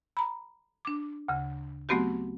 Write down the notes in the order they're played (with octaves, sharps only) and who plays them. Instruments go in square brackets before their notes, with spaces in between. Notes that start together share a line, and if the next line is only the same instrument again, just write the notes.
[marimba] A#5 B5
D4 D6
D2 C#3
F#3 A3 B3 C4 F#4 G4